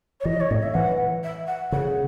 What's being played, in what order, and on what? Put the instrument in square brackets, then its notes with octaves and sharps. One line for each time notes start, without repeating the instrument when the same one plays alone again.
[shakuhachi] C#5
[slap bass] E3 [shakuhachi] D#5
[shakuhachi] C#5
[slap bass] A2 [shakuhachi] D#5
[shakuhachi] E5
[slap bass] E3 [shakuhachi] F#5
[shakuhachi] E5
F#5
[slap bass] C#3 [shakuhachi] F#5